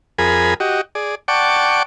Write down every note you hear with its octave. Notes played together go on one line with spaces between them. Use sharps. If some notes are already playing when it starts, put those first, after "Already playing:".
F2 G#4 A#4 G#5 B5
F#4 G4 D#5
G#4 D5
D5 F#5 G5 A5 C#6 D6